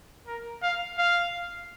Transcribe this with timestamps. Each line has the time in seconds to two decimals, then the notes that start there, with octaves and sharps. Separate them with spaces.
0.27 A#4
0.63 F5
0.98 F5